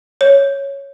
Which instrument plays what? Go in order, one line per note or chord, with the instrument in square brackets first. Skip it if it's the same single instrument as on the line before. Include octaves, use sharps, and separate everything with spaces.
[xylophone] C#5